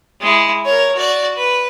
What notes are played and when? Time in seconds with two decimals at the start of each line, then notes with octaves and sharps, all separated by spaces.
0.21 G#3 E4
0.65 A#4 C#5
0.95 F#4 D5
1.37 B4